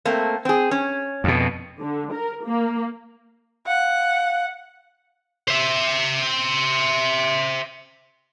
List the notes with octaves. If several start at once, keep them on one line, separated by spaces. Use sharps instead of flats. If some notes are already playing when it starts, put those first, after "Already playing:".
A3 A#3 C4
C4 G#4
C#4
F2 B2
D3
A#4
A#3
F5 F#5
C5 E5